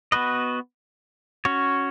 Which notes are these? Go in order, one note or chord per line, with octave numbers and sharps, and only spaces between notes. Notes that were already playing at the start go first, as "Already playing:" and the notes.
B3 F#4 B4 D#5
C#4 F#4 C#5